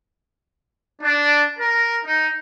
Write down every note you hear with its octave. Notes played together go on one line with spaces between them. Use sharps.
D4
A#4
D#4